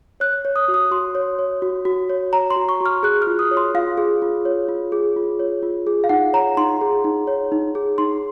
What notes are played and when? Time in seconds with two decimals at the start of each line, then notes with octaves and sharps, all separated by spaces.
0.20 C#5 F#6
0.45 C#5
0.56 D#6
0.68 F#4
0.74 D#6
0.91 F#4 C6
1.15 C#5
1.39 C#5
1.62 F#4
1.85 F#4
2.09 C#5
2.33 C#5 A#5
2.50 C6
2.56 F#4
2.69 C#6
2.81 F#4 F6
3.03 G#4 F#6
3.22 F6
3.27 F4
3.39 D#6
3.51 C#5
3.57 C6
3.75 F4 F5
3.97 G#4
4.22 F4
4.45 C#5
4.69 F4
4.92 G#4
5.16 F4
5.40 C#5
5.63 F4
5.87 G#4
6.04 F5
6.09 D#4 F#5
6.33 C#5 A#5
6.57 D#4 C6
6.81 G#4
7.04 D#4
7.27 C#5
7.52 D#4
7.75 G#4
7.98 D#4 C6